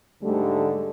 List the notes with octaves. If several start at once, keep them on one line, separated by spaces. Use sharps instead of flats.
D2 G#2 D3 G3 A3